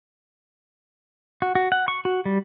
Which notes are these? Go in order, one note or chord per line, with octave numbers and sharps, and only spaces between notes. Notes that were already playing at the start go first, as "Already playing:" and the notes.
F#4
F#4
F#5
C#6
F#4
G3